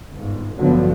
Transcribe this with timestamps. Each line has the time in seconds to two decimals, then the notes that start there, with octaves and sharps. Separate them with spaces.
0.13 G1 G#2
0.57 A1 G2 D3 F3 F#3 B3